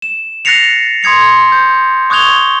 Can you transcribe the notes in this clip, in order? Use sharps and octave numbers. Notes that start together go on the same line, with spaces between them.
E7
F#6 A6 A#6 C7 C#7 F7
C6 D#6 G#6 C#7 F7
G6
C#6 D#6 F#6 G#6 F7 G7